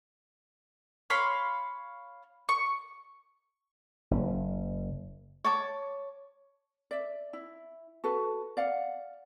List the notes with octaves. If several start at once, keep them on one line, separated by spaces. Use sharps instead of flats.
C#5 F5 B5 C6
C#6
F#1
C#5 A5 D6
D5 E5
E4
F#4 A4 B4
D5 F5 F#5